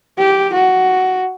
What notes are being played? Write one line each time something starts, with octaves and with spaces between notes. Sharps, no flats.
G4
F#4